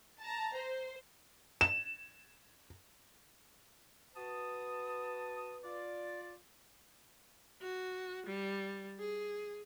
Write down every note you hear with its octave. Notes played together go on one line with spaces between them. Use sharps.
A5 A#5
C5
E7
F#4 B4 A5 D#6
F4 D5
F#4
G3
G#4